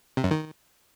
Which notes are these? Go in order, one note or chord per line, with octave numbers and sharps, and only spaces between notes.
C3
F#2
D#3